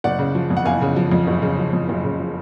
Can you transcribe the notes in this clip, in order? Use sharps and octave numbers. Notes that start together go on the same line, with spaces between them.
F#1 D5 F#5
C#3
F3
F2
F#5
F#1 F5 G#5
C#3
F3
F2
F#1
C#3
F3
F2
F#1
C#3
F3